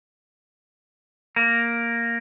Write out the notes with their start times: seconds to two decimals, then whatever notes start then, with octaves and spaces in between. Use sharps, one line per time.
1.36 A#3